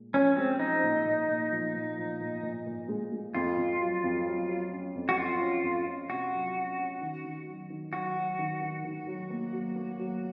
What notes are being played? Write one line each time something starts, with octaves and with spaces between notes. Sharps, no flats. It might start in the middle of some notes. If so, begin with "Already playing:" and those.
Already playing: A#2 G#3
F3 C#4
G#3 C4
F3 D#4
A#2
A#2
A#2
F3
A#2
F3
A#2
A#2
A#2
G#3
G#3
F2 F4
F2
F#3
F2
F#3
F#3
C#4
F2
F#4
F2 F4
C#4
F2
C#4
C3 F#4
F#3
C#4
C#4
D#3
D#3
F#3
D#3
F#3 F#4
F#3
D#3
D#3
D#3
F#3
A#3
F#3
A#3
F#3